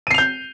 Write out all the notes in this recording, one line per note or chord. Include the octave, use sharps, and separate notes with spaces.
G6 C7 D#7 F7